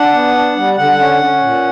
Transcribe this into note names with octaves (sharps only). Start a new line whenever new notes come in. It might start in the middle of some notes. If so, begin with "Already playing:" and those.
Already playing: D4 F#5
B3
D4
G3
D3 F#5
C#4
C#4
A#2